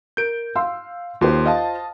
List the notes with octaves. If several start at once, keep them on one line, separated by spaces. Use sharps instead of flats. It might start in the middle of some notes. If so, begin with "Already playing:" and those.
A#4 G6 D7
F5 C6 E6
D#2 F4 G4 C5 C6
D#5 F5 A5